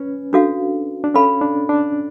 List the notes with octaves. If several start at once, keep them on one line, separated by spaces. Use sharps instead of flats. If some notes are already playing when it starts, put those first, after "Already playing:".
Already playing: C#4 B4
D4 F#4 A4 F5
D4
C#4 A4 F5 B5
D4
D4